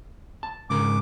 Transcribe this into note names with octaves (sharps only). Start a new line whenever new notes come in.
A5
G#2 C#3 A#4 D6